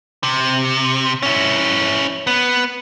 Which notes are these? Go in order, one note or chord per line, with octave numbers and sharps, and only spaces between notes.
C3
C#4 E4
B3